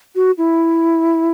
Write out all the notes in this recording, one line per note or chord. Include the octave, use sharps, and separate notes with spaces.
F#4
E4